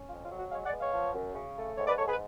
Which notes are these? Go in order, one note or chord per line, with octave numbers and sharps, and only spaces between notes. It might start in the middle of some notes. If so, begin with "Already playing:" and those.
Already playing: C#4
F2 F4
F4
F#3
F#4
G#3 C#5 F5
D5 F#5
B3
C#5 F5
F3
F#2
C#3
A3
G#2 C#5
B4 D5
G#2 A4 C#5
G#4 B4